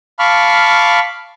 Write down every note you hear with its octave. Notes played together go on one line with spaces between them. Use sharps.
F5 A5 B5 C#6 D6 F6